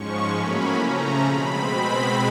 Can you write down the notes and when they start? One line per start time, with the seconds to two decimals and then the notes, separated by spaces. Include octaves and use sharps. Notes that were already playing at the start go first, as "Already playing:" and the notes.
Already playing: G#2 F3 G#3 C#4 C#6
0.28 A2 F#3 A#3 C#4 B5
0.74 C#3 F3 A3 C#4 A#5
1.22 B2 G#3 C4 B5